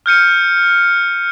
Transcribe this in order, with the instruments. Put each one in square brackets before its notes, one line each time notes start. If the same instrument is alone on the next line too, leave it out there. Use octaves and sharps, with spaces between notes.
[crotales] F6 G6 C#7 D#7